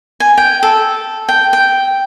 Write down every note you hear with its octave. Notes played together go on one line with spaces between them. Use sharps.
G#5
G5
A4
G5
G5